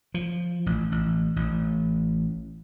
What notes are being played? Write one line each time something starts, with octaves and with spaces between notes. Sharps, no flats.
F3
A1
A1
A1